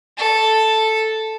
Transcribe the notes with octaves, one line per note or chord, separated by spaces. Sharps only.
A4